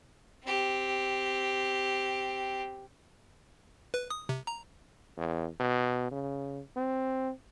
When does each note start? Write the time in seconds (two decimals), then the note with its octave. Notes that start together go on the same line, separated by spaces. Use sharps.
0.44 C4 G4
3.94 B4
4.10 D#6
4.29 C3
4.47 A#5
5.17 E2
5.60 B2
6.11 C#3
6.76 C4